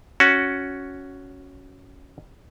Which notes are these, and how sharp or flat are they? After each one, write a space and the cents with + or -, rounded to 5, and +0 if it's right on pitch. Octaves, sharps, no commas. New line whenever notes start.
C#4 +5 F#4 +0